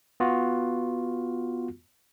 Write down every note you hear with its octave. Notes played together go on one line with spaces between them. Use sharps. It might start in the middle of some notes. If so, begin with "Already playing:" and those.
B3 F4 F#4